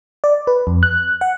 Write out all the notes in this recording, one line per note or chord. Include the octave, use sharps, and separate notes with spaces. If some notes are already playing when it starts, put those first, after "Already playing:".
D5
B4
F2
F#6
F#5